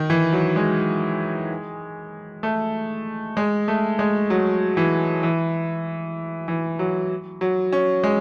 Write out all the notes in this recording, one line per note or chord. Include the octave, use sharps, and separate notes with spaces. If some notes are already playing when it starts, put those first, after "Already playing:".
Already playing: D#3
E3
F#3
G#3
A3
G#3
A3
G#3
F#3
E3
E3
E3
F#3
F#3
C#4
G#3